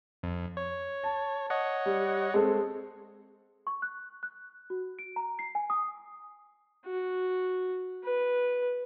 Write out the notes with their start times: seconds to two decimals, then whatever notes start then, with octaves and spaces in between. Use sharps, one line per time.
0.23 F2
0.57 C#5
1.04 A5
1.50 C#5 D#5 F#5
1.86 G3
2.34 G#3 C4 A4
3.67 C#6
3.82 F#6
4.23 F#6
4.70 F#4
4.99 D7
5.16 A#5
5.39 C7
5.55 G#5
5.70 D#6
6.86 F#4
8.03 B4